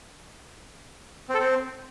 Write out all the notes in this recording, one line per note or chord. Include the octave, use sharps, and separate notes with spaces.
C4
A4
C4